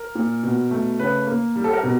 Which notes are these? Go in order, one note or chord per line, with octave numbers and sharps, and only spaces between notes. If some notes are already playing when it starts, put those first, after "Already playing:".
Already playing: A#4
A#2
B2
A3
C#3 B4
A#3
G3
A4
A#4
B2